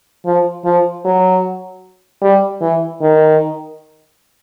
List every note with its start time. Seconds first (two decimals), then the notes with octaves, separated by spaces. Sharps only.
0.26 F3
0.65 F3
1.05 F#3
2.22 G3
2.61 E3
3.01 D#3